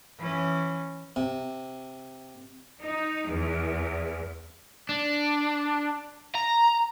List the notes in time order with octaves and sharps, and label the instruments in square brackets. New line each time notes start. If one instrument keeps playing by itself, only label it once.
[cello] E3 C#4
[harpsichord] C3
[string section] D#4
E2
[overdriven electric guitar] D4
A#5